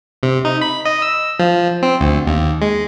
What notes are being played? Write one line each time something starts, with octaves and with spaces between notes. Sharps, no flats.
C3
D#4
B5
D#5
E6
F3
C4
D2
D#2
G#3